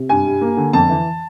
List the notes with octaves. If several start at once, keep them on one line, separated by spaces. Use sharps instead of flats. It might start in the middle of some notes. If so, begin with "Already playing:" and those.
Already playing: C3
G2 G#5
G3
A#3
D3
F2 A5
E3